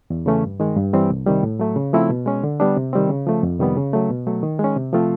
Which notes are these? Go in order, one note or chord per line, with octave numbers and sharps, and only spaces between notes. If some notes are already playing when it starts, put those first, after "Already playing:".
E2
C#3 E3 A3 C#4
G2
D#3 G#3
G2
E3 G3 C4
C2
C3 D#3 G3
A2
F#3 A3
C#3
F3 A3 C4 E4
B2
G#3 C#4
D3
G3 B3 D4
C3
D#3 G3 C4
C#3
F3 A3
F2
C3 D#3 G3 B3
C#3
F#3 A3
B2
F#3 A3
D#3
G#3 C#4
C3
F3 A3 C4 F4